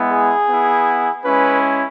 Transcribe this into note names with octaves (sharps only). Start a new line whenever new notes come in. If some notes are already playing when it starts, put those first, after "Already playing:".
Already playing: G#3 B3 E4
G#4
B3 E4
G#3 C#4 E4 B4